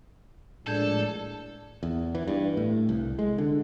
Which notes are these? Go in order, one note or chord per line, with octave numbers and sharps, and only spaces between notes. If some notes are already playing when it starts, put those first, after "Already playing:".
A#1 A2 G#3 D4 A4 A5 G6 G#6
E2
E3
G2
A2
C2
G#3
D3